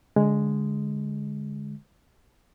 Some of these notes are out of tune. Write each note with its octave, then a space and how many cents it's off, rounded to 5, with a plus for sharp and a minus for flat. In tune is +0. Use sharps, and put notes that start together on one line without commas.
D3 -20 G#3 +0